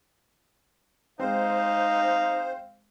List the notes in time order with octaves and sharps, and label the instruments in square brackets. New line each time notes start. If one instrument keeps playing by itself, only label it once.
[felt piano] G#3 C4 [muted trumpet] D#4 [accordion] C5 [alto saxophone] F5